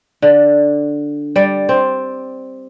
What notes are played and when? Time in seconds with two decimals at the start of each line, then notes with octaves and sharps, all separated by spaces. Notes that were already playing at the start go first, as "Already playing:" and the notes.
0.22 D3
1.36 G3 D5
1.69 C4